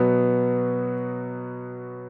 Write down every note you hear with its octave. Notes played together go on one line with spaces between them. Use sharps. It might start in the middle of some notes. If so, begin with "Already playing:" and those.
Already playing: B2 F#3 B3